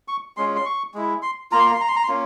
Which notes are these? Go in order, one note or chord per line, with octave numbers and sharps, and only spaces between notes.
C#6
G#3 C#4 F4 C6
C6
C#6
G#3 E4
C6
A#3 F4 A#5
C6
A#5
C6
A#5
C6
A#5
C6
A#3 C#4 F4